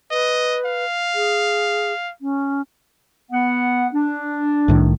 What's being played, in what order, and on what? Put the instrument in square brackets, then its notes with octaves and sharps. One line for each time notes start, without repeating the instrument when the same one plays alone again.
[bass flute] B4 [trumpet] D#5
[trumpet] F5
[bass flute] G#4
C#4
[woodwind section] B3 F#5
D4
[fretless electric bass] C2 A2 D#3